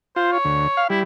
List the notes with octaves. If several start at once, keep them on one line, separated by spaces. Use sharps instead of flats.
F4 C5
C#5
D2
F5
G3 E4